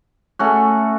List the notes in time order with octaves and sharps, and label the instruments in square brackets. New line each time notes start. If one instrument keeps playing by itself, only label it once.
[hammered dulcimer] A3 C#4 F#4